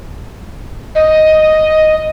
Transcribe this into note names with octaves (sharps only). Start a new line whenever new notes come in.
D#5